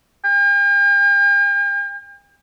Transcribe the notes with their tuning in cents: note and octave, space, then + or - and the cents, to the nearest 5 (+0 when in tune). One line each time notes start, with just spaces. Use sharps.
G5 +45